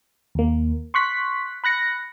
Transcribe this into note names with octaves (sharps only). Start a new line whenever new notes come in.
D#2 A#3
C6 C#6 F#6 B6
B5 F#6 A#6 C#7